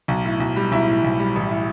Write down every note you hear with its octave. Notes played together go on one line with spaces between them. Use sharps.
B1
A2
B1
G3
B1 E4
A2
B1
G3
A1
A2